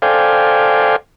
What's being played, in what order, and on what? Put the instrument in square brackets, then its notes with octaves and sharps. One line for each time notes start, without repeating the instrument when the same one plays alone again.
[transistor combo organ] A4 C5 D5 F5 G5 G#5